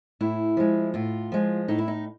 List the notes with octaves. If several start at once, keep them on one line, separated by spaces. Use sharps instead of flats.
A2 E4
F3 G#3
A2 F4
F3 G#3
A2 D#4
E4
D#4